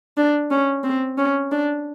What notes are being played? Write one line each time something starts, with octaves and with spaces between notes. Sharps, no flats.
D4
C#4
C4
C#4
D4